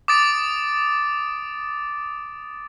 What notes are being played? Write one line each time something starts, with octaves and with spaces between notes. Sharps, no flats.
D6 D#6 A6 D7